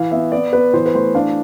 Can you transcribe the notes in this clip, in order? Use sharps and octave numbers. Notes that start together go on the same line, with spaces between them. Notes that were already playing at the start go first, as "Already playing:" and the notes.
Already playing: E3 F5
B3 E5
B3 D5
B3 B4
E3 C5
B4
A3 C5
D4 F5